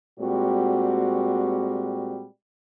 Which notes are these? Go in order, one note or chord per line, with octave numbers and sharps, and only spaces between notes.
A#2 G3 G#3 C4 F#4